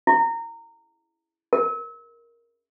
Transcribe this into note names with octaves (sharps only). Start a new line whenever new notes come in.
E4
A#4